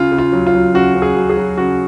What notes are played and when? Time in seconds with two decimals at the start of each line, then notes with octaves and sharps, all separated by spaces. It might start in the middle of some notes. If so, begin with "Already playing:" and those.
Already playing: C#3 F4
0.12 C#3
0.18 F4
0.32 F#3
0.47 F4
0.54 F#3
0.74 C#3 F#4
0.95 C#3
1.02 G#4
1.17 F#3
1.30 G#4
1.37 F#3
1.57 C#3 F#4